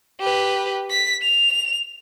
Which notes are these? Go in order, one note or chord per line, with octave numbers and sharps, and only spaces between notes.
G4 B4
B6
F7